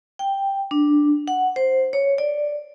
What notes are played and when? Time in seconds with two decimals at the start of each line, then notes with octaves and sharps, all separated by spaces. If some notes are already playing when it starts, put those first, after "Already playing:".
0.19 G5
0.71 D4
1.28 F#5
1.56 C5
1.93 C#5
2.18 D5